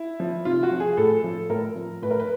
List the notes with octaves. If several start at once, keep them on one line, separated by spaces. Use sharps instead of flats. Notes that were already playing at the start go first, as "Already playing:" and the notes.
Already playing: E4
F3
C3 F4
F#4
F3
G#4
A2 A4
F3
A2 A#4
F3
A2 B4
A#4
B4